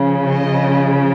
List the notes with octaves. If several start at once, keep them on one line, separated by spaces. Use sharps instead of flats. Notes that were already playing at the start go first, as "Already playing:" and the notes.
Already playing: C#3 F3
D#5